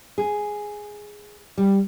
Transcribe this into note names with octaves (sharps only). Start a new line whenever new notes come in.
G#4
G3